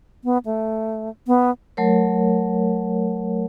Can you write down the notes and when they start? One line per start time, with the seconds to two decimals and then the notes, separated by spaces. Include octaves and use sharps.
0.24 B3
0.46 A3
1.27 B3
1.77 F#3 A3 A#4 C#5